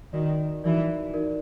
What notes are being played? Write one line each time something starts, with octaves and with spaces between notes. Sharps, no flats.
D#3 D#4 F#4 A#4 D5
E3 D#4 F#4 A#4 D5
D#4 F#4 A#4 D5